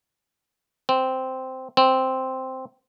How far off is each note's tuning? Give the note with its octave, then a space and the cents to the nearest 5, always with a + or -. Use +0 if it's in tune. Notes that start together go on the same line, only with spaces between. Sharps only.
C4 -10
C4 -5